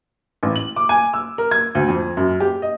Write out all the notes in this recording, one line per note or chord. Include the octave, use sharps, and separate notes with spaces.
A1
F#7
D6
G#5
E6
A#4
G#6
D2
F2
F#2
G4
D#5